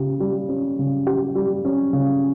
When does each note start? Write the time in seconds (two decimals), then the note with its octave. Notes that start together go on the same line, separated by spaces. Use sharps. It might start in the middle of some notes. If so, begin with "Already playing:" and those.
Already playing: C#3 G4
0.20 G3
0.49 C#4
0.79 C#3
1.07 G4
1.35 G3
1.65 C#4
1.93 C#3